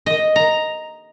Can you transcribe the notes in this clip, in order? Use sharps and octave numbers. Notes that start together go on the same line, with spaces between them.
D#5
A#5